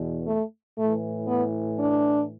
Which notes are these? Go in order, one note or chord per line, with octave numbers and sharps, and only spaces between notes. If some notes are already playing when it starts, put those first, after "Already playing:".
Already playing: E2 B2
A3
A2 E3 A3
B3
D4